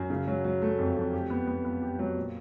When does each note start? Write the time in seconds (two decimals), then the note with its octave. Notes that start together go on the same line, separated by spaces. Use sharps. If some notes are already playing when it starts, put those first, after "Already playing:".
Already playing: F#2
0.10 C#3
0.28 F#3
0.44 F#3
0.62 A3
0.79 F2
0.96 F2
1.13 G4
1.30 B3
1.47 B3
1.65 B3
1.82 G4
1.99 F#3
2.16 A#2